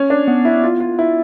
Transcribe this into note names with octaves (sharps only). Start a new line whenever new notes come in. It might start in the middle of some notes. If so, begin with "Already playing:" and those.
Already playing: C#4
D4
B3
E4
F4
F4
E4